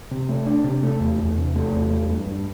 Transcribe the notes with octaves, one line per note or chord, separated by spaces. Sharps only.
C3
A3
D4
C3
A3
E2
E2
C3
A3
E2
A3
G2
G2